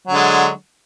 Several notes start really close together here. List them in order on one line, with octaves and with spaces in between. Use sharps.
F#3 D3 G#3